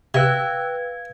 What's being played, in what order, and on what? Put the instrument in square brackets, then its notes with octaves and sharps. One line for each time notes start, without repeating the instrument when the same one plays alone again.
[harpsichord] C3 [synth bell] B4 F5 G#6 [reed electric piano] G5 E6 F#6